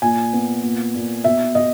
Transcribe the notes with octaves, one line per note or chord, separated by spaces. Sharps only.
A#2 G#5
B3
A#2
A#2
B2 E5
B2 D#5